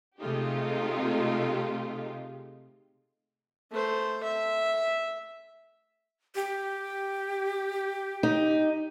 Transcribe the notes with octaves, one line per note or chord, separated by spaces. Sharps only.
C3 G#3 A3 D#4 F4 G4
A3 C5
E5
G4
D#4